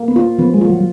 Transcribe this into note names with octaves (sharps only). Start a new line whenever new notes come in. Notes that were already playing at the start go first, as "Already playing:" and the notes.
Already playing: A#3
B3
F4
F3 B3
G#3
F4
F#3